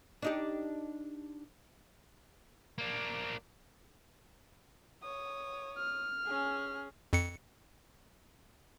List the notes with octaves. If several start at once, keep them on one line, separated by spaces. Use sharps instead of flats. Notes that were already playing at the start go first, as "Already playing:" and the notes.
D4 D#4 G4
A#3 D4
C#5 D#6
F6
C#4 G#4
F2 C#7